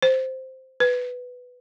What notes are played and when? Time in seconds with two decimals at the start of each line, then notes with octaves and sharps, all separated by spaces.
0.02 C5
0.80 B4